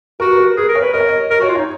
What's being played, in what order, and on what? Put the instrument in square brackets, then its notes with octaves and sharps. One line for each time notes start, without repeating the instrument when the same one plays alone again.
[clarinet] F#4 [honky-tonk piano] A#4
[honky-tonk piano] B4
A#4
[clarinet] G#4 [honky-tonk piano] B4
[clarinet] A#4
[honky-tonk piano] C#5
[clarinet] B4
[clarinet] A#4 [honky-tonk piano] D#5
[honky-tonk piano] C#5
D#5
[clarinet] A#4 [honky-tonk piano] D#5
[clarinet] F#4 [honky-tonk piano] C#5
[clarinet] F4
[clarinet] D#4 [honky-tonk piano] C#5